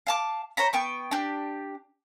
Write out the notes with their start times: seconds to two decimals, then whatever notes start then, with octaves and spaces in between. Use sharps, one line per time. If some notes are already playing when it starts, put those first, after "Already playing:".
0.07 F5 A5 D6
0.57 C5 C#5 A#5 B5
0.73 B3 G5 C#6
1.11 D4 G4